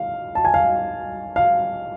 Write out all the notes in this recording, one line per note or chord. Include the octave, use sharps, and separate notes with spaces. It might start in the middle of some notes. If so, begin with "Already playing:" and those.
Already playing: F5
A5
G#5
F5
F5